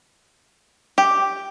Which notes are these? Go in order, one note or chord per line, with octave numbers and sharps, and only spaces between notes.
G4